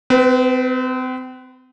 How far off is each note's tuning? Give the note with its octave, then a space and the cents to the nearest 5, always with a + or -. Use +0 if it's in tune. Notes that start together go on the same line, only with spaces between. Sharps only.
C4 -35 B4 +10